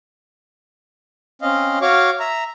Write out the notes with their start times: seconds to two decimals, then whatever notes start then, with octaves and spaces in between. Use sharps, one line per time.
1.42 C4 C#4 D#5 F5
1.81 F#4 C#5 F5 C#6 D6
2.20 E5 A#5